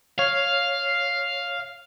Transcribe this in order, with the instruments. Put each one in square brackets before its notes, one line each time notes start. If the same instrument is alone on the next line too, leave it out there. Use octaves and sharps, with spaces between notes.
[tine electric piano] C#5 [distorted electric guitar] F5